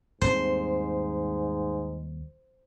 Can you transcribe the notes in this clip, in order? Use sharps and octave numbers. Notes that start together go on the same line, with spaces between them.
D#2 G#2 G3 C4 C5